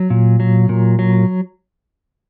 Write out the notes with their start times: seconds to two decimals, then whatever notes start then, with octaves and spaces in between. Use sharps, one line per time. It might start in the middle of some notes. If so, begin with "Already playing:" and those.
Already playing: F#3
0.10 A#2
0.40 F#3
0.69 A#2
0.99 F#3